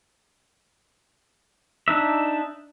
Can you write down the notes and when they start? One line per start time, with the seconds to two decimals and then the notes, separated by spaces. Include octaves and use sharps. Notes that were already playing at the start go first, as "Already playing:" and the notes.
1.88 D4 D#4 E5